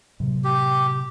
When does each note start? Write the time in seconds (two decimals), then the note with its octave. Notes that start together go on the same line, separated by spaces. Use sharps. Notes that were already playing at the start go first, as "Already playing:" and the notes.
0.20 A2 C3 F#3
0.44 G4